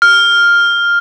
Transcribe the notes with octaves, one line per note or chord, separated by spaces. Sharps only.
F6